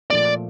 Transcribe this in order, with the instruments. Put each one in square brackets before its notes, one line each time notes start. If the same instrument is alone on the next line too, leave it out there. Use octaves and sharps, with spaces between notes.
[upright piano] A#2 F3 A3 [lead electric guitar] D5